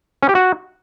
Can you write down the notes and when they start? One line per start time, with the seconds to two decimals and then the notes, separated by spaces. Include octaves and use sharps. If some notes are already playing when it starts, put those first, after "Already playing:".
0.23 C#4
0.29 G4
0.35 F#4